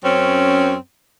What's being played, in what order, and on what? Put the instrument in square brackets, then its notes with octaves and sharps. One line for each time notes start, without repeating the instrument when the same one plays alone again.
[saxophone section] F#2 C4 C#4